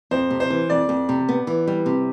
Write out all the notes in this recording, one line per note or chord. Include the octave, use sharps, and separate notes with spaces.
F2 C5
C3
C5
E3
F2 D5
F2
C3
B3
E3
G3
C3